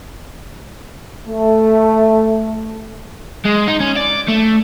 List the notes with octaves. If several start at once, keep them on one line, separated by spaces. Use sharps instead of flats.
A3
G#3
D#4
C#4
D5
A3